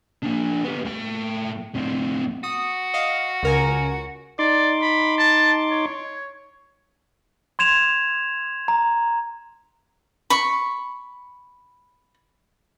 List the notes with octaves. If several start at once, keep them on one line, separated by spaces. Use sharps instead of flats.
A#3 D4
B3 G4
A2 G5
A2 C4
F#4 D#6
D#5 F5
C#2 A#4 G#5
D#4 D5 C6 D6
B5
A5
C#5
C6 G#6 E7 F7
A#5
B5 C#6